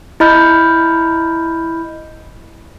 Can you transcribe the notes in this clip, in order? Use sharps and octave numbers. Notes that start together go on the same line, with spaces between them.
E4 D#5 B5 F6 G6